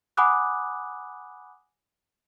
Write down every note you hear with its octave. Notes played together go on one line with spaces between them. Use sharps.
F#5 G#5 B5 D6 D#6 F#6